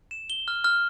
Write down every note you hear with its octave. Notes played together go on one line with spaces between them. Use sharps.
E7
G7
F6
F6